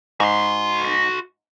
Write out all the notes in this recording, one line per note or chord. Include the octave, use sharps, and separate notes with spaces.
G#2 F#4 C6